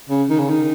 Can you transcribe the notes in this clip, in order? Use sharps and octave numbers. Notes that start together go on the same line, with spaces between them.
C#3
D#3
C#3
D#3